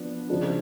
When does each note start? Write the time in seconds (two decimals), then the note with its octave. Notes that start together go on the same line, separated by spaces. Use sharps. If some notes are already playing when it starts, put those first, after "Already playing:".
Already playing: F3 B3 D4
0.30 C#3 F3 G#3 D4